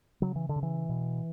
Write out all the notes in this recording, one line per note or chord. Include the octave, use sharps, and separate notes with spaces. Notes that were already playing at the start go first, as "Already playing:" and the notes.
C#3 F#3
E3
D3
C#3
E3
B2